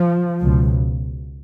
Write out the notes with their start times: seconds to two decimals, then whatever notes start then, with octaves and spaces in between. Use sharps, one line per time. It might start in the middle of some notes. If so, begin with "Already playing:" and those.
Already playing: F3
0.40 C#2 B2